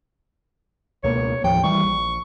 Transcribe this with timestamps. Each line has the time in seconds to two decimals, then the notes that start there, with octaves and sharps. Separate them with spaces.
1.04 C#2 B2 A#3 C#5
1.44 D#2 A2 F3 G5
1.64 E3 G3 C#6
1.84 A#1